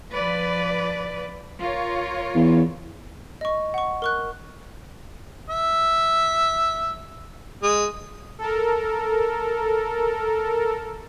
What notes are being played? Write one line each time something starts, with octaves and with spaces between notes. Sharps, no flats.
F3 B4 D5
F4 A#4 C#5
E2
D#5 C#6
F#5 C#6
A#4 C#6 F#6
E5
G#3
A4 A#4